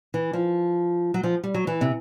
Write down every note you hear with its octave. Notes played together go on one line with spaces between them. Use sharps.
E3
F3
F#3
F3
G3
F#3
E3
C3